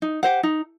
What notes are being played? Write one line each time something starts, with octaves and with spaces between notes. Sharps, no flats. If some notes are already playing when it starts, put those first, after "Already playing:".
D#4
G4 C5 F#5
D#4